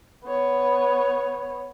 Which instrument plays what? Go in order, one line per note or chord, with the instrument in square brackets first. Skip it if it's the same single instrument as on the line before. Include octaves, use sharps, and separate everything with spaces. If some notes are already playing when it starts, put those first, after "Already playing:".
[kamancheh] B3 C#5